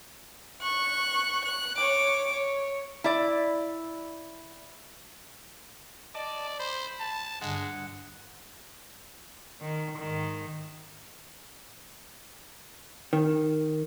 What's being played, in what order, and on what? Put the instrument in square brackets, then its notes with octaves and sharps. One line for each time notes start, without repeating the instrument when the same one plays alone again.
[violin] C#6 F#6
F#6
C#5 D6
C#5
[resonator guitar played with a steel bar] E4 D5
[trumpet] D5 [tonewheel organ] D#5 A5 D6
[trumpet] C5 [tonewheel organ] B5
[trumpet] A5
[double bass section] G2 D3 [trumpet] G#3 [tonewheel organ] F#5
[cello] D#3
G#2 D#3
[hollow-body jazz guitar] D#3